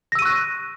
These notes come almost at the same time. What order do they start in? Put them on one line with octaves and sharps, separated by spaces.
A#6 E6 D#7 C#6 F#6